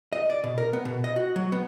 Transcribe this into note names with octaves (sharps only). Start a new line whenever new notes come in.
D#5
D5
B2
A#4
B3
B2
D#5
F#4
F#3
B3